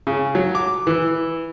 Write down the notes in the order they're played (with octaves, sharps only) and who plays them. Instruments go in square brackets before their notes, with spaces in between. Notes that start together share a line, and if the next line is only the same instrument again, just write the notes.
[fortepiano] C#3
F#3
D6
E3